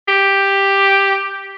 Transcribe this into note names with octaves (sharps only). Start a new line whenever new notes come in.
G4